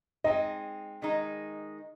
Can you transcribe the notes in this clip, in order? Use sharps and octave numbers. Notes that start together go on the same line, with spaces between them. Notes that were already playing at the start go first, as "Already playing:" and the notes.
G#3 C4 D#4 D#5
D#3 G#3 D#4